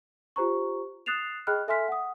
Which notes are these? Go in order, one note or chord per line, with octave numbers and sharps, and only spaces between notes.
F4 G4 C5 A#5 C#6
D#6 F#6 A6 C7 E7 F7
G#4 D#5 G5 B5 F6 F#6
A4 E5 G#5 C6 F6 B6
F#5 D#6